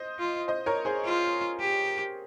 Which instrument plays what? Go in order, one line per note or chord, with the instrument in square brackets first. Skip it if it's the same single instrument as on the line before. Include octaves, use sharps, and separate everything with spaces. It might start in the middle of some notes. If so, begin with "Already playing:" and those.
Already playing: [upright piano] C5 D#5
[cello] F4
[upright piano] C5 D#5
A#4 C#5
G#4 C5
[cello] F4
G4